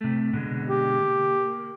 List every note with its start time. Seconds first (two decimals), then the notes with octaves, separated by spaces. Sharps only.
0.01 C3 A3
0.33 B2 D3 G#3
0.69 G4
1.01 A#3